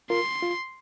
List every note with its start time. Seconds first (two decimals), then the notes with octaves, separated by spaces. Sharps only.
0.10 F4 A#4 C6
0.42 F4